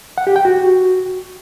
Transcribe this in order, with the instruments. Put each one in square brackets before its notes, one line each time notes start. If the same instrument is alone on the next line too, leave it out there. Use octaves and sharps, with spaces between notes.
[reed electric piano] F#5
G4
G5
F#4